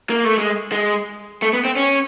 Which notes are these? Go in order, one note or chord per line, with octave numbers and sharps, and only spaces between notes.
A#3
A3
G#3
G#3
A3
B3
C4
C#4